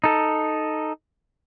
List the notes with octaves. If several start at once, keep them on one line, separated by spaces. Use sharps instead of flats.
D#4 A4